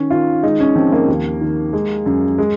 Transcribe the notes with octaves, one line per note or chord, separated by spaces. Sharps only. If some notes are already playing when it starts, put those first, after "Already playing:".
Already playing: D#3 C#4
D#3 F4
G#3 D#4
C#4
F3 C4
A#3
D#2
D#3
G#3
F#2
G#3